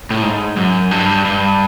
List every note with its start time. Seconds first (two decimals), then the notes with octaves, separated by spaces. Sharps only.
0.11 A2
0.22 G#2
0.57 F#2
0.91 G2
1.25 G2